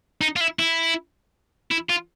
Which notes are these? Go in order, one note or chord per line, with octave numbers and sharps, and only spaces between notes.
D#4
F4
E4
E4
E4
F4